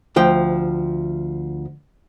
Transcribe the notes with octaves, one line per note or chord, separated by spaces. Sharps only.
D2 F3 G5